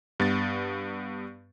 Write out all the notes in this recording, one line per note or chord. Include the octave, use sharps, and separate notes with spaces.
G2 B3 A6